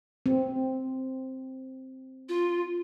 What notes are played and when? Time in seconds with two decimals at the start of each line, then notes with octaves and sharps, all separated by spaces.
0.26 C4
2.29 F4